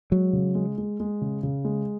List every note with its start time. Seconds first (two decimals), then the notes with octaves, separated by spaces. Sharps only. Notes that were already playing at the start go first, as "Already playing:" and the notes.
0.11 F#3 G#3
0.33 C#3
0.55 G#3
0.78 G#3
1.00 G#3
1.21 C#3
1.43 C#3
1.65 G#3